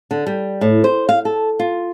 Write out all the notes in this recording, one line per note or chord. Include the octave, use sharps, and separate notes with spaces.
D3
G3
A2
C5
F5
A4
F4